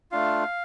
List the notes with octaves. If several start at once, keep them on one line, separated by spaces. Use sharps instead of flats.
A3 D4 F4 F5